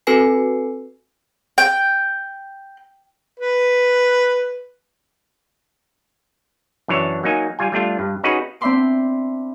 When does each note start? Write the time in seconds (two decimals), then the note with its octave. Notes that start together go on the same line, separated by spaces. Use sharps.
0.07 C4 F#4 A4 B4 G#5 C7
1.58 G5
3.39 B4
6.88 F#2 E3 D4 C#5 A5
7.23 F#3 A#3 D#4 G#5
7.59 G3 F4 G#5
7.72 G3 A3 D4 F4
7.99 G2
8.24 C#4 D#4 F#4 G#4 B4
8.61 C4 D4 E5 B5 C6 D6